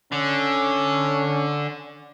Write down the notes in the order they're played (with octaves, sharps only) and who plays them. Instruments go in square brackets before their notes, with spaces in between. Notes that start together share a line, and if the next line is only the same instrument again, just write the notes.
[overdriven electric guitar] D3 [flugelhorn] C#4